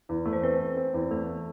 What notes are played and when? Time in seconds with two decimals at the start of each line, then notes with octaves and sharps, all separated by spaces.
0.09 E2
0.26 A3
0.33 C5
0.42 C4 B4
0.59 C4
0.77 C4
0.94 E2
1.11 A3 A4